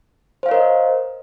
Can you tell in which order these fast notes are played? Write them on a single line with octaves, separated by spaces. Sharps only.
C5 F5 C#5 A#4 D#5